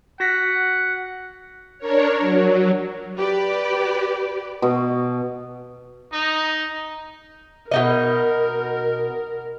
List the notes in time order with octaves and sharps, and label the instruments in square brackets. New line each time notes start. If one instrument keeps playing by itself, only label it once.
[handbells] F#4 A#6 B6 [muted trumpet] F#5
[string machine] D4 A#4 C#5
F#3
[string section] G4 B4 D5
[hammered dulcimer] B2
[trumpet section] D#4
[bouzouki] B2 D#4 D#5 [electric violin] A#4